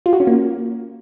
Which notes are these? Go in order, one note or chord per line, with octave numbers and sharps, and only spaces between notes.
F4
F#4
C#4
A#3